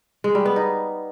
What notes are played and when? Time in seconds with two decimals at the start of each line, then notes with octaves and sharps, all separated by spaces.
0.24 G#3
0.35 G3
0.46 B3
0.56 D#4